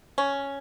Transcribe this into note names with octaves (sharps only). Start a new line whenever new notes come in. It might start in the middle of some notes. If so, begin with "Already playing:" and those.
C#4